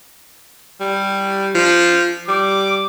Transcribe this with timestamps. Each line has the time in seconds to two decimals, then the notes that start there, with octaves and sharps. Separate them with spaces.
0.81 G3
1.55 F3
2.28 G3 D6